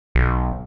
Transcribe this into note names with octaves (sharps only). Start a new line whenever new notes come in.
B1